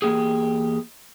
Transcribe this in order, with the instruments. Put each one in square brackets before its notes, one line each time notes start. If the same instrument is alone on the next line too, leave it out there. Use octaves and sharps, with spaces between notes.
[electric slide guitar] E2 F3 A#3 G4 G#4